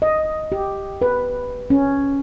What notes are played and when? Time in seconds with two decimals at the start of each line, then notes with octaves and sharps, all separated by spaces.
0.02 D#5
0.52 G4
1.02 B4
1.70 C#4